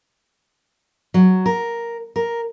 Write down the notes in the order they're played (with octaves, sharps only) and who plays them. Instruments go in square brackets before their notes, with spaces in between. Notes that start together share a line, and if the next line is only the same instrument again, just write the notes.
[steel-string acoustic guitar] F#3
A#4
A#4